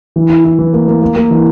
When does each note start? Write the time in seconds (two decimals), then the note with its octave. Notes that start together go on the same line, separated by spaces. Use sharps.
0.16 E3
0.30 E4
0.44 E4
0.59 E3
0.73 A#3
0.88 A#3
1.02 A#3
1.16 A#3
1.30 E3